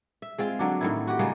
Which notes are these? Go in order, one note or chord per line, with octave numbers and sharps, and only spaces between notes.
E5
G#3 C4 F4
D3 F#3 D4
A2 D#3 E4
F#4 G4
C#3 G3 G#3 A#3